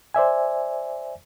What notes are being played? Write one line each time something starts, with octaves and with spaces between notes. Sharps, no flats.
C5 D5 E5 G#5